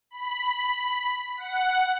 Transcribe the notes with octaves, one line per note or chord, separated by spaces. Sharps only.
B5
F#5